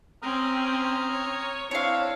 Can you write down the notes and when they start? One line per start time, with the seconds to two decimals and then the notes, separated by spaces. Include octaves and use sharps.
0.22 C4 C#4 A#5 D#6 F6
1.12 C#5
1.71 C4 D4 E4 C#5 F5